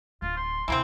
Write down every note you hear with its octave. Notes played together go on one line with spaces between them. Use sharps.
D1 F4
C6
D2 C3 E3 A#3 C4